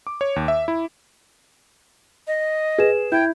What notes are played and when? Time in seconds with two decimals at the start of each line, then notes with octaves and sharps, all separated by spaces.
0.07 D6
0.21 C#5
0.36 D#2
0.48 E5
0.68 E4
2.27 D#5
2.78 G#4 B4 E7
3.12 E4 G5 G6 G#6